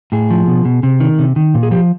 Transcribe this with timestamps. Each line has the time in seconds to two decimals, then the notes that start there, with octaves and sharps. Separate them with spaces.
0.12 A2 G#4
0.31 F3
0.47 B2
0.65 B2
0.83 C3
1.00 D#3
1.19 C3
1.36 D#3
1.54 A#2
1.63 G#4
1.71 F3 G4